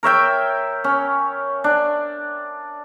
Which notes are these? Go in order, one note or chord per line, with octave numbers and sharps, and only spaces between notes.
A#4 C#5 E5 G5
C#4
D4